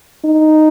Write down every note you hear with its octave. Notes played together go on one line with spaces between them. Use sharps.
D#4